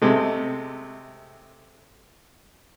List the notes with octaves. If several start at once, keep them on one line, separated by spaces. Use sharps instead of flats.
C3 G#3 A3